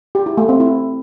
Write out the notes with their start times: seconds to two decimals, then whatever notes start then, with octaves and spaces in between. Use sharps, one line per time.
0.15 G4
0.26 E4
0.37 A3
0.49 C4
0.60 E4